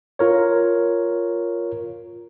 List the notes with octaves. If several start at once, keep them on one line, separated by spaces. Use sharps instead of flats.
F4 A#4 C#5